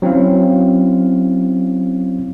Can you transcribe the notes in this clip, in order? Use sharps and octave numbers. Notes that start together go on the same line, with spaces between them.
F#3 C4 C#4 E4 F5